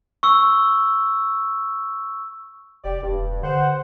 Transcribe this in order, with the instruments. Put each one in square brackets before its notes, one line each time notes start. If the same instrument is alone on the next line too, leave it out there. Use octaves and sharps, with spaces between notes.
[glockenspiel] C#6 E6
[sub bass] F1 [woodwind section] G4 D5
[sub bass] E1 [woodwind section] G2
[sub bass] D3 [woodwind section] C5 F#5